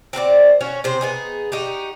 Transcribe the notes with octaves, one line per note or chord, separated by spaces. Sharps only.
C4 F#4 B4 D5
C#4 F#4 C#5
C3 C5
B3 D#4 G#4
D#4 F#4 G4